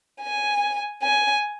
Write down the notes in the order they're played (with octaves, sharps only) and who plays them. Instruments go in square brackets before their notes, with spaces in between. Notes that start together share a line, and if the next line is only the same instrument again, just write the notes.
[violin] G#5
G#5